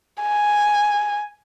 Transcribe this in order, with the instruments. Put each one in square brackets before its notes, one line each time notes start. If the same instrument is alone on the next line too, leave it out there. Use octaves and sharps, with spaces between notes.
[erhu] G#5